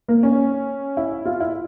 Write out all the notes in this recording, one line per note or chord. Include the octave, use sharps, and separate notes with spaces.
A#3
C#4
E4
F4
E4